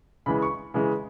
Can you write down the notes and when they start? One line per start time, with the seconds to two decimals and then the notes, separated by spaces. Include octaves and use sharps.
0.26 C#3 E3 G#3 B5
0.42 C#6
0.74 C#3 E3 G#3